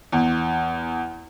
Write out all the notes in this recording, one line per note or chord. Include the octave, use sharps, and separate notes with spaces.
E2